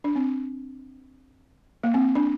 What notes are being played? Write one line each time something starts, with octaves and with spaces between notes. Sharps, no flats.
D4
C4
A#3
C4
D4